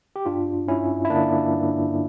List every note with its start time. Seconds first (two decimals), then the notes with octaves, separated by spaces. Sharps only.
0.16 G4
0.26 G2 D4 F4
0.67 G2 C#4 E4
1.05 E4
1.10 D3 A#3 D4
1.52 G2